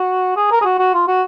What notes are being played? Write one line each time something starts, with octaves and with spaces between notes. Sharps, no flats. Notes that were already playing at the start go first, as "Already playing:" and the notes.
Already playing: F#4
G#4
A#4
G#4
F#4
F#4
F4
F#4